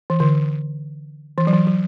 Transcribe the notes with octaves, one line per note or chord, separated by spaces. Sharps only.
E3
D3
E3
F#3
E3
F#3